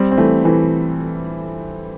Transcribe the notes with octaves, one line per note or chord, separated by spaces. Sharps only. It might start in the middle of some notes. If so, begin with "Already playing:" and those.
Already playing: G3 C4
C4
E3 A3
E3 A3